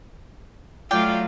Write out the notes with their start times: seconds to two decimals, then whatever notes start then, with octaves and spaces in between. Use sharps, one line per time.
0.91 F#3 A3 F4 D5 F5 G5